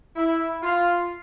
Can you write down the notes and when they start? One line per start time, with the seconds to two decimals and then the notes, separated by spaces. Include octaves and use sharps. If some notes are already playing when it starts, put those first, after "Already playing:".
0.16 E4
0.62 F4